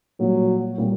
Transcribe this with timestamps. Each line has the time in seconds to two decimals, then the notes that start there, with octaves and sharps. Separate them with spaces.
0.19 A#2 F#3 G3 A#3
0.78 A#2 G3 A#3